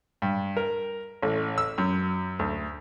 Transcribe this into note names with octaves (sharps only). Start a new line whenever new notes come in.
G2
A#4
A1
E6
F#2
D2